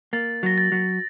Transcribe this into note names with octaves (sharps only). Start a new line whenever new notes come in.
A#3 A6
F#3 A#6
A6
F#3